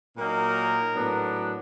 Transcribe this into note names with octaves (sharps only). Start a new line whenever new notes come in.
A#2 F#3 A#3 D#4 A#4
A2 F#3 B3 D4